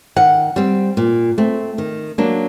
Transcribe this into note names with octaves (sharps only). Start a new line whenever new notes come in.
D#3 F#5
G3 C4
A#2
A3 C4
D#3
F#3 A#3 D4